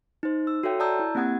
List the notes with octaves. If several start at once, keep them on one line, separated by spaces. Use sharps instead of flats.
D#4 C5
E6
F#4 A4 C#5 E5 G5
D5 A5 A#5 D#6 E6 G6
E4
A#3 C4 G4 F#5 D#6 G#6